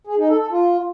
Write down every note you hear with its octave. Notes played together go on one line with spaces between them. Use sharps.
G#4
D#4
A4
A4
F4